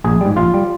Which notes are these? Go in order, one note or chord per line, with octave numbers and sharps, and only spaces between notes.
A#1 G#4
G#2 G3
A#1 F4
G3